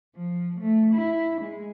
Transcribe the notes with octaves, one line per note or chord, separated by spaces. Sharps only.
F3
A3
E4
G#3